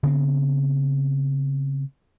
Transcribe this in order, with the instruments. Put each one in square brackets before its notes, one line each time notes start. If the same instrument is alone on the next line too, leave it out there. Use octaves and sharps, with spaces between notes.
[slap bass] C#3 B3 C4